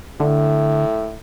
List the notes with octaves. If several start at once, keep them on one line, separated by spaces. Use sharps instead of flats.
A2 D3